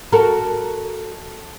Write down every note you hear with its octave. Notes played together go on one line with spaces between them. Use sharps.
F#4 A4 A#4